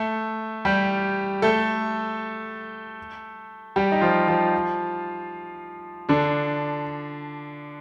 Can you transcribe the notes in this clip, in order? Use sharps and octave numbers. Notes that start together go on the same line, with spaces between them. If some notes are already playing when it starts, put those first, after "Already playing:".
Already playing: A3 A4
G3 G4
A3 A4
G3 G4
D#4
F3 F4
F3 F4
D3 D4